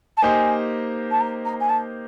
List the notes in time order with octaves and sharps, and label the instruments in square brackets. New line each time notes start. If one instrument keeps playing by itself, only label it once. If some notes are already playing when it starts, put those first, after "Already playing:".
[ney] A5
[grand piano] A#3 D#4 G4 C5 D#5 [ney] G#5
[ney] A5
A#5
A#5
G#5
A5